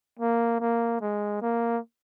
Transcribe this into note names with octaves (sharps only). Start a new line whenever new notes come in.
A#3
A#3
G#3
A#3